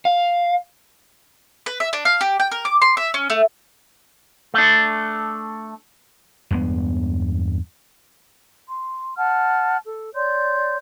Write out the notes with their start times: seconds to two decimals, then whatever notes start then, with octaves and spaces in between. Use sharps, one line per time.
0.05 F5
1.66 B4
1.80 E5
1.93 D4
2.05 F5
2.21 G4
2.40 G5
2.51 A#4
2.65 D6
2.82 C6
2.97 E5
3.14 C#4
3.30 A3
4.54 A3 D4
6.51 E2 G2 G#3 B3
8.68 C6
9.16 F#5 A5 F6
9.85 A4
10.14 C#5 D5 C6 G6